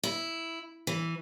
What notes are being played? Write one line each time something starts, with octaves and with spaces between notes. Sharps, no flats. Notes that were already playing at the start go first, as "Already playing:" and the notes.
E4
E3